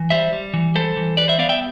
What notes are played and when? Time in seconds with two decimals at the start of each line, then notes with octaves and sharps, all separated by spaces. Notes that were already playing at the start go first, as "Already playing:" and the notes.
Already playing: E3
0.10 G3 C5 E5
0.33 G3
0.54 E3
0.75 G3 A4 C5
0.97 E3
1.17 G3 B4 D5
1.28 C5 E5
1.39 B3 D5 F5
1.49 E5 G5